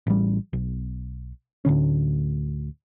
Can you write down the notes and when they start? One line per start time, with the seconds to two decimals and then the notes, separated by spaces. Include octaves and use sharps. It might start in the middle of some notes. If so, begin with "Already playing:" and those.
0.07 A1 G3
0.53 B1
1.65 D2 A2 D3 C#4